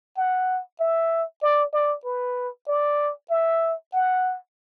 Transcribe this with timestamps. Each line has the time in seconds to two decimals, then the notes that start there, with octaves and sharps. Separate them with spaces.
0.17 F#5
0.80 E5
1.43 D5
1.73 D5
2.05 B4
2.68 D5
3.30 E5
3.93 F#5